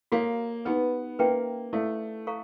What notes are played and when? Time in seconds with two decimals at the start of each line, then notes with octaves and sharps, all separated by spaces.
0.12 A#3 F#4 A4 C#5 F5
0.65 B3 D#4 G4 B4
1.19 A#3 C#4 F#4 B4 E5 G5
1.73 A3 E4 A4 D5 F5
2.27 A4 C5 F5 A#5 C#6